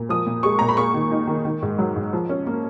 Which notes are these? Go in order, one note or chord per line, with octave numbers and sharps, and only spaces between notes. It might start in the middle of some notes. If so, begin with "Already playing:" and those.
Already playing: A#2
F3 D#6
A#2
G#3 C#6
A#2 A#5
B5
A#3 C#6
D#3
D#4
D#3
D#3
G#2
F#3
G#2
F3
C#4
A#3